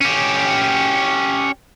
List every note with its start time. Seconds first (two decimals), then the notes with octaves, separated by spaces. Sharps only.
0.01 C#4 G4